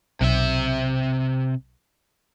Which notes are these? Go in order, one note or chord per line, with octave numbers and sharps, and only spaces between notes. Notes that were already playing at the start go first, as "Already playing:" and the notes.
B1 C3 E5